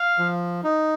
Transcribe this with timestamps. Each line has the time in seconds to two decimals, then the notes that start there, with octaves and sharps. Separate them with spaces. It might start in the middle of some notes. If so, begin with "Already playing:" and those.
Already playing: F5
0.18 F3
0.64 D#4